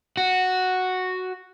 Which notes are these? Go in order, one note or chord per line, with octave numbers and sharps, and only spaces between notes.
F#4